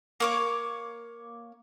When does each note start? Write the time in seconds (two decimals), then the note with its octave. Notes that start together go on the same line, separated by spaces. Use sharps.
0.20 A#3 C#5 D6